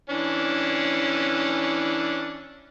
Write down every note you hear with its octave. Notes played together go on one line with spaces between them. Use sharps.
E3 C#4 D4